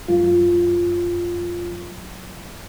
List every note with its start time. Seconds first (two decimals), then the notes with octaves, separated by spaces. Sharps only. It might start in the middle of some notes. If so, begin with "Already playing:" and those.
0.08 F#2 F#3 F4